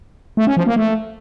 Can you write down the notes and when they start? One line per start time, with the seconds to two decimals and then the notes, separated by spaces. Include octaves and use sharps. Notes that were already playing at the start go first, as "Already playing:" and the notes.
0.37 A3
0.47 C#4
0.57 F3
0.67 A#3
0.76 A3